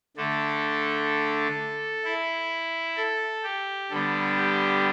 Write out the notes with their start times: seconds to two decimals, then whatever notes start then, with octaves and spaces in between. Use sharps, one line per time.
0.17 D3 A3 D4 A4
2.04 E4
2.97 A4
3.43 G4
3.90 D3 G3 B3 D4 A4
4.37 G4